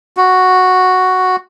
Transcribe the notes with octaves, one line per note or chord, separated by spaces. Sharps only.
F#4